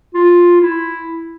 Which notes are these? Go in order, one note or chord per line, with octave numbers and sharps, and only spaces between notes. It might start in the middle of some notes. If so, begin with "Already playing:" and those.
F4
E4